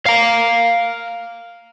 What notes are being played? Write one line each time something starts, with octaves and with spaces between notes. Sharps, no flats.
F5 A#5